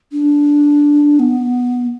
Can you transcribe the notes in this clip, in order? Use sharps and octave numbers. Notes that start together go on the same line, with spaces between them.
D4
B3